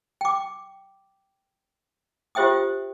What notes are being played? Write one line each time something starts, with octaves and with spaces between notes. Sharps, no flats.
G5 D6
F4 G4 C5 E5 G5 D#6